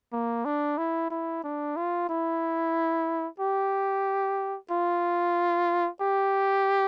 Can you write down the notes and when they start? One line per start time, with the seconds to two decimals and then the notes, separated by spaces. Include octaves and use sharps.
0.13 A#3
0.45 D4
0.78 E4
1.11 E4
1.44 D4
1.76 F4
2.10 E4
3.40 G4
4.71 F4
6.02 G4